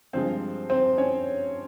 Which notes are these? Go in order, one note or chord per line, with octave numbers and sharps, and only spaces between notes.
G2 F3 G#3 C4 C5
C4 C5
C#4 C#5